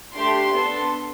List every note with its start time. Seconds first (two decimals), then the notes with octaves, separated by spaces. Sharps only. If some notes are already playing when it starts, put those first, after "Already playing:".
0.15 A3 D4 G4 C6
0.53 B3 D4 A4